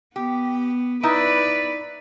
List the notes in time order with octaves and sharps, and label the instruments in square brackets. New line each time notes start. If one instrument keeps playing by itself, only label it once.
[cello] B3 [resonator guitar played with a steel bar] G4
[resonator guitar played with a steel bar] D#4 E4 [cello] B4 D5